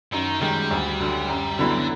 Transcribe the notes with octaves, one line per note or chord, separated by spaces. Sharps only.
F#2 D#3
D#3 G3 G#3
D2
D3 F#3
F#2
D3 F#3 B3 E4
D3